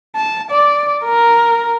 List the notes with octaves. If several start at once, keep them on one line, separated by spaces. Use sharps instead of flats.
A5
D5
A#4